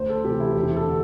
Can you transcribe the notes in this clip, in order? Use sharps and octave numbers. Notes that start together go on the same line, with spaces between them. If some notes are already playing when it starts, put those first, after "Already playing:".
Already playing: D2 C5
A4
C3 E3 G4
E4
E1 G4
A4
D3